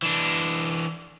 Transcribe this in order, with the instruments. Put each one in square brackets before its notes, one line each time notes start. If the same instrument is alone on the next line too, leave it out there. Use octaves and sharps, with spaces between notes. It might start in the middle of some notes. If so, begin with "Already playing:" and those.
[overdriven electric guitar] E3 D4